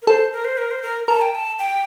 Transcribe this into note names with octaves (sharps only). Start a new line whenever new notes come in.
A#4
A4 C5
A#4
C5
A#4
C5
A#4
A#4 A5
G5
A5
G5